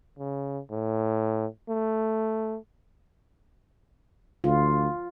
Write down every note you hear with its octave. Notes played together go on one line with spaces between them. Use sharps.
C#3
A2
A3
D2 F4